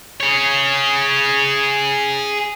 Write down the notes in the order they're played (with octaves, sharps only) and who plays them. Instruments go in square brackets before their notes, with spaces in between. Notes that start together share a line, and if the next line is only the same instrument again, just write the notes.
[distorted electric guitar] G#4 C#5